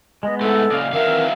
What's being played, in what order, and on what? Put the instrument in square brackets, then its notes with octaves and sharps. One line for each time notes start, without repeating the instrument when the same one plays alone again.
[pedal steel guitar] G#3 B3 [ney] D#5
[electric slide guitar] G#2 A3 [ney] A4
[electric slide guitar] A#2 C#3 [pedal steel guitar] D5 D#5 F5
[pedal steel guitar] D#3 E3 C4 [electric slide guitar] F#3 E5 F5 [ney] A#4